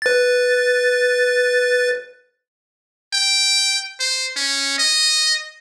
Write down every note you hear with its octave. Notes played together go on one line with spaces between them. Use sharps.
B4 A6
G5
C5
C#4
D#5